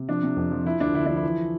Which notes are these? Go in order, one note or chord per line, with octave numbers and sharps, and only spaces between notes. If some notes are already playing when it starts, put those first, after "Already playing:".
Already playing: C3
F3 D4
C3
F2
F3
F3 E4
D2 D4
D3 E4
F3 D4
E4
E3